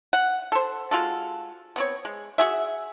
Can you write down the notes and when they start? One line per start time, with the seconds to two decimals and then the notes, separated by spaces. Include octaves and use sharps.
0.13 F#5
0.52 A4 C5
0.91 G#3 F4 F#4 A4
1.76 B3 C4 C#5
2.05 G#3
2.38 F#4 G#4 E5